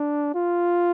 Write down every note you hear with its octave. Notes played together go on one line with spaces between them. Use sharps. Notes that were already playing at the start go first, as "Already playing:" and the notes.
Already playing: D4
F4